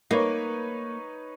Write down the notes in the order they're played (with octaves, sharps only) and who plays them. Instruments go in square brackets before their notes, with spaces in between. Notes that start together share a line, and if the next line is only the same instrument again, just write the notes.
[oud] A#3 [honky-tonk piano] D#4 B4 C#5